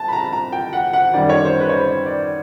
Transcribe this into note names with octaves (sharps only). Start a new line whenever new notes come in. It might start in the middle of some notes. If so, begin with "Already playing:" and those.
Already playing: C2 A5
B5
A#5
A#5
G5
F#5
F#5
F#2 D#3 G3 D5
C#5
C5
B4
C#5
C5
D5